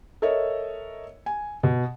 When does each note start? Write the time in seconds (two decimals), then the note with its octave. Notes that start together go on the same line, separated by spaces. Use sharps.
0.22 A4 A#4 C#5 D#5 E5
1.26 G#5
1.63 B2